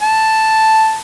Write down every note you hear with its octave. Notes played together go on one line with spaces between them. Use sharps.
A5